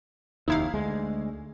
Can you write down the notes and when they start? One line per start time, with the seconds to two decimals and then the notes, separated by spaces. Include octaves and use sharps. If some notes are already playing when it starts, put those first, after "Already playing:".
0.48 F1 D#2 D#4 E4 F5
0.74 D2 G#3